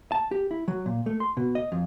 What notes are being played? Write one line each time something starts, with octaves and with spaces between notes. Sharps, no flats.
A5
G4
E4
F#3
A#2
A3
C6
B2
D#5
F2